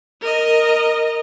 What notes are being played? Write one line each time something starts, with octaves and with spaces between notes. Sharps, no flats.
A#4 D#5